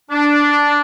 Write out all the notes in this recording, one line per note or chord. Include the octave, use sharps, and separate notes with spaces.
D4